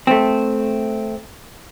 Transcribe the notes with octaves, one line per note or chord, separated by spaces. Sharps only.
A3 C4